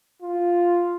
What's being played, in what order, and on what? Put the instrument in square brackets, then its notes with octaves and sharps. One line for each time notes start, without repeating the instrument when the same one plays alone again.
[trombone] F4